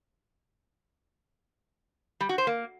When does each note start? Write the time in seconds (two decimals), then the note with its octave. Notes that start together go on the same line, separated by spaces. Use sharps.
2.20 G3
2.29 F#4
2.38 C5
2.47 A#3